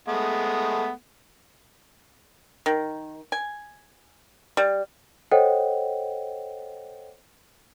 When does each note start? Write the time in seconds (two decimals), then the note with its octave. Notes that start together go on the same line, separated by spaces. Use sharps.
0.08 G#3 A3 B3
2.66 D#3
3.32 G#5
4.57 G3
5.31 A4 C5 C#5 D#5 F#5 G5